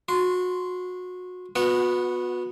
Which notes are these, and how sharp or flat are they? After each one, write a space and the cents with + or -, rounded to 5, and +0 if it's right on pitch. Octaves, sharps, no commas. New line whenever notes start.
F#4 -25 C6 -15
B3 +0 F#4 -35 F#5 -10